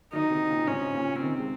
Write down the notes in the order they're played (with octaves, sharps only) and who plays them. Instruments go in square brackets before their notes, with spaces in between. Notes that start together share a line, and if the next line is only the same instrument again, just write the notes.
[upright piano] D#3 F#3 [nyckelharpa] D#4
[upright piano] C3 D#3
A#2 C#3
[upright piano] G#2 C3 [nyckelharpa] C#4
[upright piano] A#2 C#3
[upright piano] C3 D#3 [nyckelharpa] C4
[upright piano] G#3